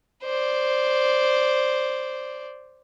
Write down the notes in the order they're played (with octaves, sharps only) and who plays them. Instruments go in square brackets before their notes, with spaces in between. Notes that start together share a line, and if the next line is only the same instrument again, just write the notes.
[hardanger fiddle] C5 D5